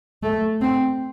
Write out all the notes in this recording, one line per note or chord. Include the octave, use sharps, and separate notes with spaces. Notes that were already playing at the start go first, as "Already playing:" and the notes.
A3
C4